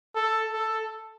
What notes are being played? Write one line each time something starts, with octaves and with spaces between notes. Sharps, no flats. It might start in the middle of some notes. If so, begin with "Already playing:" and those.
A4
A4